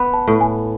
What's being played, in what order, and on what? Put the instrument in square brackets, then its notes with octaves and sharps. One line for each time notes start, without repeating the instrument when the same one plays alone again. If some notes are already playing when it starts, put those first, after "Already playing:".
Already playing: [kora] B3 [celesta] B5
[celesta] A5
[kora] A2
[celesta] G#5